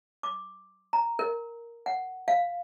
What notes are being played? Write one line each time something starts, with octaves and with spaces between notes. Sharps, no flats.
D6
A#5
A#4
F#5
F5